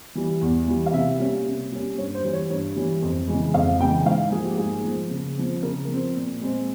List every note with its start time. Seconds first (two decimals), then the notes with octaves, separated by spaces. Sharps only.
0.15 E3 G3
0.41 E2
0.68 E3 G3
0.86 F5
0.93 C3 E5
1.19 G3 A#3 C#4
1.46 C3
1.72 G3 A#3 C#4
1.98 G2 C#5
2.14 C5
2.24 E3 G3
2.33 C#5
2.50 G2 C#5
2.76 E3 G3
3.02 F2
3.28 C#3 E3 G#3
3.54 F2 F5
3.80 C#3 E3 G#3 G5
4.06 G#2 F5
4.32 F3 A#3 G#4
4.45 G4
4.58 G#2 G#4
4.84 F3 A#3
5.11 C#3
5.36 F3 C4
5.62 C#3 A#4
5.88 F3
5.93 C4
6.15 A#2
6.41 G#3 C4